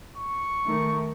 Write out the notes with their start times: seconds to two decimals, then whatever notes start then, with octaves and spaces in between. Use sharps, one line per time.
0.18 C#6
0.65 D#3 A3